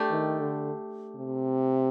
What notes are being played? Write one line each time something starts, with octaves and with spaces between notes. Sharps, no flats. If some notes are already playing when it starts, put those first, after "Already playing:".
Already playing: A3 D4 G4
D#3
D3
C3